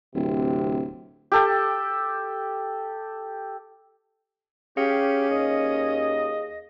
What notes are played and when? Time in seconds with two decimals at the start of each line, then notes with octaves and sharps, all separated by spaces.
0.15 D1 C3
1.32 G4 A4 G5
4.77 C#4 G4 G#4 F5
5.30 D#2 D#5